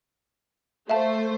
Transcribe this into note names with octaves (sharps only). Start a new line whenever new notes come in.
A3 C5 E5 F5 A5